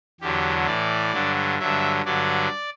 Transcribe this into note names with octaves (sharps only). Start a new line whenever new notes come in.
E2 D3 F#3 G4
A2 E3 D5
G2 D3 F#3
G2 D3 F#3 E5
G2 D3 F#3 D5